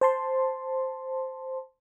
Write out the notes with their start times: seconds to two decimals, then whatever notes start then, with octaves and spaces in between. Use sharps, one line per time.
0.01 C5 A5 C6